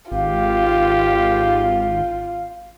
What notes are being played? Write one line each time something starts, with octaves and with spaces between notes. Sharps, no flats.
G#1 F4 G4 F5